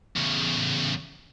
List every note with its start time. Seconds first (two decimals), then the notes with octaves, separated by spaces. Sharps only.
0.16 E2 C#3